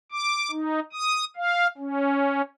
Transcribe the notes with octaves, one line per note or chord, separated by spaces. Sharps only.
D6
D#4
D#6
F5
C#4